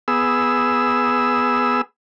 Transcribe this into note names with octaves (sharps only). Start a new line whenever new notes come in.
B3 G#4 E6